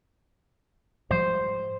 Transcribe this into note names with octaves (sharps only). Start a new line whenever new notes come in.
G#2 F3 G3 C5